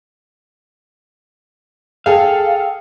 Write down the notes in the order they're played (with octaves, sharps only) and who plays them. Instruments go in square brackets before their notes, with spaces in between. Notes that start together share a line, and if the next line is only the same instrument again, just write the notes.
[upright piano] G#4 A4 [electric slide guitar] F5 [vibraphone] G5